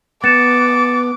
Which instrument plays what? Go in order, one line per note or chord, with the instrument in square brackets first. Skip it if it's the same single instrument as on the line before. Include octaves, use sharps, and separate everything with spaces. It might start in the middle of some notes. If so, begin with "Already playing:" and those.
[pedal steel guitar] B3 [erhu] D6 [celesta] A6 C#7 E7